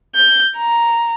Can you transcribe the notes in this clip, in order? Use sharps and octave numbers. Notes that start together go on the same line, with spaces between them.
G6
A#5